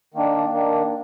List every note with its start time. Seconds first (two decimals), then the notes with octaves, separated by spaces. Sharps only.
0.14 D#3 A#3 D4
0.52 D#3 A#3 D4